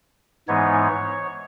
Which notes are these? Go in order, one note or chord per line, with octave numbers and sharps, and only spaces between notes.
G#2 E3 G#3 B3 D#4 C#5